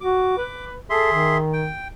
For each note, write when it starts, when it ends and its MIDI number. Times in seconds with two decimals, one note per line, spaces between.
0.01 0.34 66
0.01 0.65 86
0.38 0.74 71
0.90 1.38 68
0.90 1.09 69
0.90 1.38 76
0.90 1.38 84
1.13 1.72 51
1.53 1.88 79